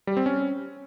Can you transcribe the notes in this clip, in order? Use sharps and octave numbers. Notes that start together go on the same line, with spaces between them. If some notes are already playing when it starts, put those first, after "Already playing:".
G3
C4
C#4